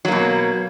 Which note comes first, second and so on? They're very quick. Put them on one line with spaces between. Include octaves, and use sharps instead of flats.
F#3 A#3 B2